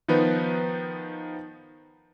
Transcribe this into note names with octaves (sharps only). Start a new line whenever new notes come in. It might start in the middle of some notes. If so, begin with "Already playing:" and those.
D#3 F3 B3 D#4 B4